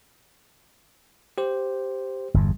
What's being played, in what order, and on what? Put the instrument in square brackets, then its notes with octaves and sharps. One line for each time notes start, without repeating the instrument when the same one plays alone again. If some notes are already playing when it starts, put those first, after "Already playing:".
[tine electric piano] G4 C5
[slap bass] G1 E2